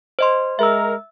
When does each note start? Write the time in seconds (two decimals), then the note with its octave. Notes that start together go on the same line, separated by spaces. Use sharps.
0.19 C5 D#5 C6
0.59 G#3 A#4 E5 E6